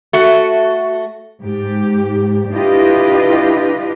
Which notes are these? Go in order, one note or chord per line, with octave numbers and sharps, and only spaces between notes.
A3 F#4
G#2 G4
D4 E4 F4 G4 B4 D#5